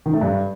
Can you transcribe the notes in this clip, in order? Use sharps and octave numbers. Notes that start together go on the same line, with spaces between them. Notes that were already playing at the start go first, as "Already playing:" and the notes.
D#3
A3
G2